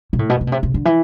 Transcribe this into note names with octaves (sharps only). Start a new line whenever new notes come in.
B2
A2
B2
C3
B2
C3
C3
D3
E3